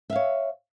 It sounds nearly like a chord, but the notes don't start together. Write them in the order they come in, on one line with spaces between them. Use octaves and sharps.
E5 F5 C#5